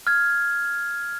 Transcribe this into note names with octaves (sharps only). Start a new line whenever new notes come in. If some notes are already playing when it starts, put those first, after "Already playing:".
F6 G#6